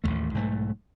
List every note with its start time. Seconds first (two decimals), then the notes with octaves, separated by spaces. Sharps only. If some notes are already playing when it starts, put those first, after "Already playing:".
0.04 A1 D#2 A2 A3
0.34 B1 G#2 E3 A3